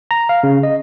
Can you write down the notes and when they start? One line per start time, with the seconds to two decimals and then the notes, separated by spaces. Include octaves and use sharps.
0.11 A#5
0.29 F5
0.43 C#3
0.63 D#5